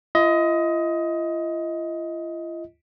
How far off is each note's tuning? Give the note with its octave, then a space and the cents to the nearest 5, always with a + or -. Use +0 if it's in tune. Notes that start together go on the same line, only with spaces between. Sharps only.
F4 -45 D#5 +20